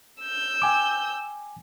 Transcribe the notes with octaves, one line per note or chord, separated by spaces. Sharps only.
E6 G6
G5 G#5 D6